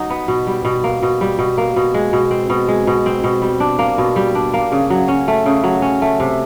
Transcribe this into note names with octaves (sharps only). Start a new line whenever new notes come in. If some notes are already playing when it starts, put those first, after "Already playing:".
Already playing: F#3 D#4
B3
B2
G3
B2
A#3
B2
G3
B2
A#3
B2
G#3
B2
C4
B2
G#3
B2
C4
B2
G3
D4
A#3
B2
G3
D4
A#3
C#3
F#3
C#4
A3
C#3
F#3
C#4
A3
C3